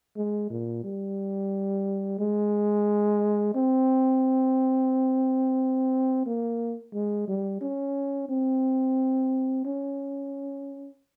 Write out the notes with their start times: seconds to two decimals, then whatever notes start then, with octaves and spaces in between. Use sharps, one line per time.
0.16 G#3
0.50 A#2
0.84 G3
2.20 G#3
3.55 C4
6.26 A#3
6.94 G#3
7.28 G3
7.61 C#4
8.29 C4
9.65 C#4